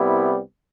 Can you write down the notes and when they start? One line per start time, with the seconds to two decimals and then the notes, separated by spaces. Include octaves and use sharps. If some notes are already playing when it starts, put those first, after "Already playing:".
Already playing: C2 C3 G3 B3 E4